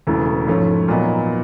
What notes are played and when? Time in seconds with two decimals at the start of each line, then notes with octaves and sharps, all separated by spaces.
0.07 E1 E2 C#3 E3 A3
0.47 G#2 F3 A3 C#4
0.88 A#2 F#3 B3 D#4